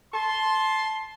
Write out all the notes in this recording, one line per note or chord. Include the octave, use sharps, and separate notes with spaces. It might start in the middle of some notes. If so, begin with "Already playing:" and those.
A5 C6